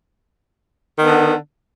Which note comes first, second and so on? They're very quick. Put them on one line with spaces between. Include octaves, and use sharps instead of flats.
D#3 B3 D3